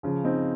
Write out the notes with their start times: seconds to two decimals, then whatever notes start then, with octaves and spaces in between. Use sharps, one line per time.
0.03 C#3 F3
0.24 C4 D#4